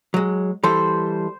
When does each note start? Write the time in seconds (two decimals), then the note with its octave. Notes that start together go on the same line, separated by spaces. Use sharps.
0.14 F#3 G#3
0.63 E3 G3 A4 C5